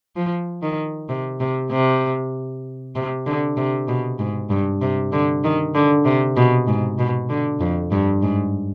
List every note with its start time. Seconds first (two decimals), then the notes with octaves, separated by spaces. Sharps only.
0.16 F3
0.62 D#3
1.09 C3
1.40 C3
1.71 C3
2.96 C3
3.26 D3
3.57 C3
3.88 B2
4.19 G#2
4.50 G2
4.81 C3
5.12 D3
5.44 D#3
5.75 D3
6.05 C3
6.36 B2
6.67 G#2
6.99 B2
7.29 D3
7.60 F2
7.92 G2
8.22 G#2